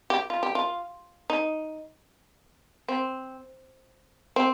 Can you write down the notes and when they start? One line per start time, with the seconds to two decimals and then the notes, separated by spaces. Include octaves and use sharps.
0.10 G4
0.30 F4
0.43 G4
0.55 F4
1.30 D#4
2.88 C4
4.36 C4